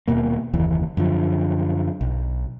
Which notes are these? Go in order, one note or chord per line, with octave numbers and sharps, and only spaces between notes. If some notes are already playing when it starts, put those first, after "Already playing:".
D#1 G#1 B2 A#3
F#1 D#2 E3
F#2 D3 F3
B1